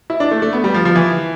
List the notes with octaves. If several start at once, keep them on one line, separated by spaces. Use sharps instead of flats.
E4
D4
A3
A3
B3
G3
F3
F3
E3